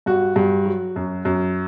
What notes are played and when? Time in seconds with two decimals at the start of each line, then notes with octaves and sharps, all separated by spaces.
0.06 G2 F#4
0.36 G2
0.65 F#3
0.96 F#2
1.25 F#2